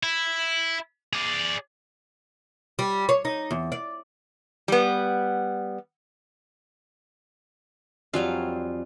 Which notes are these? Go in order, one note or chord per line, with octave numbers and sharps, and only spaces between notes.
E4
G#4 D5
G3
C#5
D#4
E2
D5
G3 B3
F2 F#3 G3 F4 F5 G#5